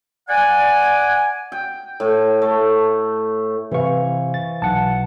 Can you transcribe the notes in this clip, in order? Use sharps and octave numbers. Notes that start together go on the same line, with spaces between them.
D5 F#5 G#5
G5
A2
A3
C3 E3 C5 F5 C#6
A6
B1 F#5 A5